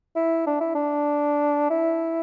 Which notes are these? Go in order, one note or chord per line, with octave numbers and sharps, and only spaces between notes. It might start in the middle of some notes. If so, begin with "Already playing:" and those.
E4
D4
E4
D4
E4